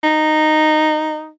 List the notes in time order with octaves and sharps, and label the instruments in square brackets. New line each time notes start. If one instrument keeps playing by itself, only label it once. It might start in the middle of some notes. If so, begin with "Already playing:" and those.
[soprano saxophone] D#4